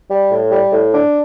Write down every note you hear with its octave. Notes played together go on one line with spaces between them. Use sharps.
G3
A2
G3
A2
D4